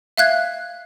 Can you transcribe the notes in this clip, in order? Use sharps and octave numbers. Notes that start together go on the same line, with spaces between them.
E5 F5 F#6 G#6